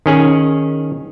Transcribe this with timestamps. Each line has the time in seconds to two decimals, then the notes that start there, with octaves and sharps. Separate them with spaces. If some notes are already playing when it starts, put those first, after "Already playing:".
0.06 D#3 C#4 G#4